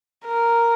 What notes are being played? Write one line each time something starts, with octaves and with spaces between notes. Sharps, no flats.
A#4